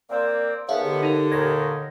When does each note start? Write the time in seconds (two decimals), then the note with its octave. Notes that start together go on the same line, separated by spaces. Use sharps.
0.10 A#3 C4 D5
0.69 D#3 F3 B3 G#4 C#5 E5 F5
0.84 D3 G4
1.03 D#4 A#4
1.32 D#2 A#2 D#3 G#6 A#6